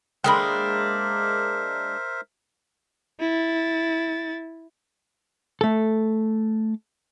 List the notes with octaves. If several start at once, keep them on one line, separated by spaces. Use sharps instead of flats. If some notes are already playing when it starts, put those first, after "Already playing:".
G#3 A#3 D4 A#4 C5 E5 G5 B5
E4 A6
A3 A4